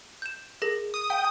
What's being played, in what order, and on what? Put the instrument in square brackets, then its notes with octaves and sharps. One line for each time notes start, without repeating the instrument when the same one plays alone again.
[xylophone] G6 E7
G#4 A#4 A#6
[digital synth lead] D#6
[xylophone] F5 [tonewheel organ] G5